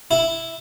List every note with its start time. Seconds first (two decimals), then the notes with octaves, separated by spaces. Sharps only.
0.11 E4